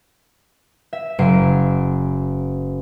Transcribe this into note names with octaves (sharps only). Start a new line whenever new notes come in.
E5
F#1 C7 D7